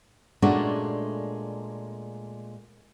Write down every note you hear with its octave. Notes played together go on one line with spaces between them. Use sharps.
A#2 G#3 A3 C#4 D4 F#4